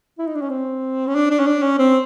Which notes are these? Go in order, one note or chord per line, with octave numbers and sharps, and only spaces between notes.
E4
D#4
D4
C#4
C4
C#4
D4
D4
C#4
D4
C#4
C4